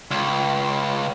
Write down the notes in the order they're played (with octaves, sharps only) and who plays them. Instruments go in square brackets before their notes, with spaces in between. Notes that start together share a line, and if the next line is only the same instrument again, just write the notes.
[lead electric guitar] C#2